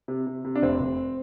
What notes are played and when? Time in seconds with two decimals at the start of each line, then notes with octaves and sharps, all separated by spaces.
0.08 C3
0.27 C3
0.45 C3
0.56 D4
0.62 F1 C4
0.80 F1